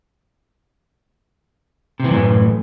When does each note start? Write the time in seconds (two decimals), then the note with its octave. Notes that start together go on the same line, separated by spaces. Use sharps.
2.00 C3
2.04 E3
2.09 F#2
2.14 A2